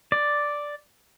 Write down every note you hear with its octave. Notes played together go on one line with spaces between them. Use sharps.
D5